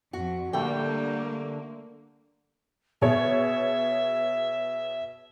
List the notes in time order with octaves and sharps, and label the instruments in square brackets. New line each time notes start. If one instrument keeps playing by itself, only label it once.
[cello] F2 [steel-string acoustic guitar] F#4
[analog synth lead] D3 [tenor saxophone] G3 [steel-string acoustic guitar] A3 G5 [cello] A#3
[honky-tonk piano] B2 G#4 C#5 [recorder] E5